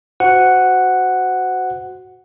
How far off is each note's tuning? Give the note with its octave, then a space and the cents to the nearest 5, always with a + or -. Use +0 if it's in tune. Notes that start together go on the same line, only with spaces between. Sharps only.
F#4 +0 C5 -30 F#5 +0